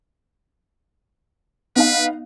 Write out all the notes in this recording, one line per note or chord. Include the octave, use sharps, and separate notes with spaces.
B3 D#4 B4 F5